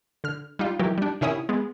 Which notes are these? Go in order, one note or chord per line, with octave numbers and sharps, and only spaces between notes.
D3 F6
G3 D#4 F4
D#3 E3 F#3 G4
G3 D4
C3 D#3 C#4 E4 C#5 D#6
G#3 B3